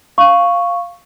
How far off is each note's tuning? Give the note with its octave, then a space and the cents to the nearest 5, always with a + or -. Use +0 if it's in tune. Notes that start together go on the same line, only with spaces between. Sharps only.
F5 +0 C#6 +0